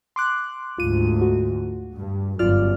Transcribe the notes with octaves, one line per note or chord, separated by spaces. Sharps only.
C6 D6 F#6
D2 G#2 F4 D#7
F#4
G2
G1 F#2 F4 D5 F6